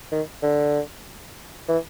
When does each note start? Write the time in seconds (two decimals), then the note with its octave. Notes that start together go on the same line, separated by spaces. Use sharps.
0.12 D#3
0.43 D3
1.68 E3